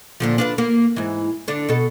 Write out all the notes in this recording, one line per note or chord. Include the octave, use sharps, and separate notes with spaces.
A#2 D3 F3
D4 F4 B4
A#3
G#2 E3
D3 D4
B2 A4